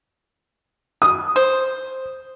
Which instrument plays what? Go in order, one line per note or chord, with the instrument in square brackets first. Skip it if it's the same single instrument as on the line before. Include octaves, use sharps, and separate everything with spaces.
[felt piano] D#6
[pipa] C5